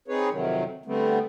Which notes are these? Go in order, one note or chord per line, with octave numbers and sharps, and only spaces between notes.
C4 D#4 G#4 B4 C#5
F2 C3 D#3 F#3
D3 G3 A3 B3 C4